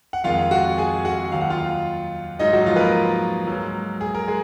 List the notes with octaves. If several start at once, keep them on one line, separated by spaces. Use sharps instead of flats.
F#5
F2 D#3 G#3 F4 F5
F#4 F#5
G#4 G#5
F#4 F#5
D#2 D#3 F#3 F5
F#5
F4 F5
G#2 F#3 D#4 D#5
F#3 F#4
F3 F4
B4
A#3 A#4
G#2 F#3
G#4
A#4
G#3 G#4